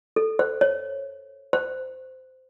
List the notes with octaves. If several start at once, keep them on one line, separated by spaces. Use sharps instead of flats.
A4
C5
C#5
C5